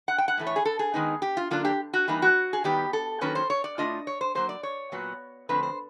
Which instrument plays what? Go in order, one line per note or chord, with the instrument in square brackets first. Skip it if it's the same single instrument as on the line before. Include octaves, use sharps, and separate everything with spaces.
[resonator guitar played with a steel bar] F#5
G5
F#5
A2 E3 A3
C#5
G#4
A4
G#4
D#3 G#3 B3 D#4
G4
F4
D3 F#3 A#3 D4 F4
G4
F#4
E3 G3 A#3 D#4
F#4
G#4
D#3 G3 B3 G4
A4
D#3 F#3 A#3 C#4 B4
C5
C#5
D5
A2 F3 A3 D4 F4 D#5
C#5
C5
B2 F#3 A#3 C5
D5
C#5
A#2 F#3 B3
D3 F3 A3 C4 B4
C5